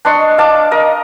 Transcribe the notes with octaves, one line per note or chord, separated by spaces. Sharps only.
D4 D#5 C6 C#6
F5 A5 D6
A#4 D#5